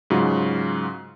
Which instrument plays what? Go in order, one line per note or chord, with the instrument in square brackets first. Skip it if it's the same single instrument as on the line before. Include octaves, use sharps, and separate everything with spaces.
[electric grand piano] G#2 C#3 F#3 F4 F#4